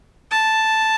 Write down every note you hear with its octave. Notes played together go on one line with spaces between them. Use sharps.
A5